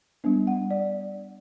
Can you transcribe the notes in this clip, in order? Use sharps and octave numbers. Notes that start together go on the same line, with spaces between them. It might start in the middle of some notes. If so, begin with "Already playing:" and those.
G3 B3 D4
F#5
D5